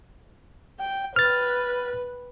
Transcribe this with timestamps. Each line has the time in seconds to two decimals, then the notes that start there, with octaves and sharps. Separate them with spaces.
0.79 G5
1.16 B4 F6 A6